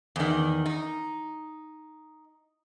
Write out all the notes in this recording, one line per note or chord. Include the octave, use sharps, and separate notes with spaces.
E2 D#3
D#4